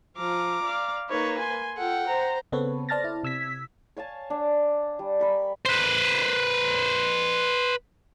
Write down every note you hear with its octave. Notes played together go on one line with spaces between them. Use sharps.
F3 F5 A#5 D6
D5 F5
A#3 D#4 B4 C#5
G#5 C6
F4 A4 F#5 G5
C5 A#5
C#3 B3 C4 A4 B4 C#5
C5 D5 A5 F6 A6 A#6
E4
C3 E6 G#6 B6
C#5 F5 G#5 A5
D4
G3
A#4 B5 C#6
B4 C5